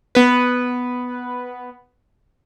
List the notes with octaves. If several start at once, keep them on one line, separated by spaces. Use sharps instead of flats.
B3 B4